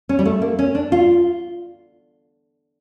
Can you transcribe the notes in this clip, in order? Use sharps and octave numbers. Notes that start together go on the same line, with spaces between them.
C#4
G3
A3
A#3
C#4
D4
F4